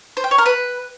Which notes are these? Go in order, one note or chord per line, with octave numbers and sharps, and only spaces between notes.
C5
G5
C#5
A#4
B4